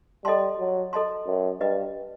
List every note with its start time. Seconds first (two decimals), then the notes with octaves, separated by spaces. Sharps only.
0.24 G3 A4 D#5 A5 C6
0.59 F#3
0.93 A4 D#5 A5 C6
1.27 F#2
1.61 G2 B4 D#5 G5